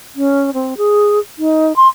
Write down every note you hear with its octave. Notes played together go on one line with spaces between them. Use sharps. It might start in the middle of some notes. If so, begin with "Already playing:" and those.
C#4
C4
G#4
D#4
C6